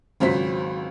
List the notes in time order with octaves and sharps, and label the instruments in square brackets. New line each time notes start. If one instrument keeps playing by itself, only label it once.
[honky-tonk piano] G#1 C#2 F#3 C5 B6